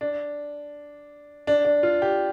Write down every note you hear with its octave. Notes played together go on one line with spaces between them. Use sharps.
D4
D4
D4
F4
G4